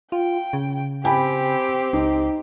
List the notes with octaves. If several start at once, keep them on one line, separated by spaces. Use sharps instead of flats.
F4 G5
C#3
C4 G4 G5 G#5 B5
C#2 D#4